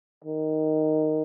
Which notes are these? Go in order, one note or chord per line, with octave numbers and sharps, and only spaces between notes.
D#3